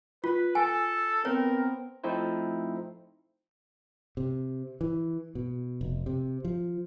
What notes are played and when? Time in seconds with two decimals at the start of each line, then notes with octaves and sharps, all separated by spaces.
0.24 F4 B4
0.55 A4 G#5
1.25 B3 C4 A#4 C#5
2.04 F3 A3 C4 D#4 E4 C5
4.17 C3
4.81 E3
5.35 B2
5.81 F1
6.06 C3
6.45 F3